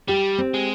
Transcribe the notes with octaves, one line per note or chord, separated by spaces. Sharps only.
G3 G4
C4
G#3